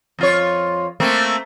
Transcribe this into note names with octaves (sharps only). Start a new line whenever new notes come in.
F2 F4 C#5
A3 A#3 C4